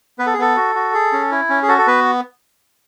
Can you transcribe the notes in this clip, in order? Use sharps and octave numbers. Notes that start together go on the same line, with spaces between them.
B3 B4
A4
G#4
B3 A4
F#4
F#4
G#4
C#4
E4
C#4
G#4
F#4 A4
A4
B3 B4